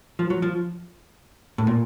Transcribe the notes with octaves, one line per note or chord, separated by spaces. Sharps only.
F3
F#3
F3
A2
A#2